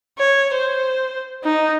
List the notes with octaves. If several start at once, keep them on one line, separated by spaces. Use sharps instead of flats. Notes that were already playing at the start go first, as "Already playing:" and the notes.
C#5
C5
D#4